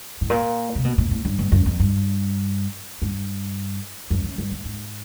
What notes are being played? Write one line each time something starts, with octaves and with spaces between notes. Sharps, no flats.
A2
A#2
C3
B2
A#2
A2
G2
G2
F#2
F2
G2
G2
F#2
F#2
G2
G2
G#2